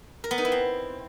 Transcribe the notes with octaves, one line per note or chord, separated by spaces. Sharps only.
A#4
B3
D#4
E4
C4